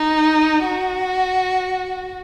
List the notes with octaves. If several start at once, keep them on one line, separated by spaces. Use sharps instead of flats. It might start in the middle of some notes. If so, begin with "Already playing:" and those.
Already playing: D#4
F#4